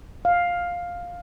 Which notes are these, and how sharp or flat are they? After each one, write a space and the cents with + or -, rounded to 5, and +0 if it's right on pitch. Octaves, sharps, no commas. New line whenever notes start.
F5 +10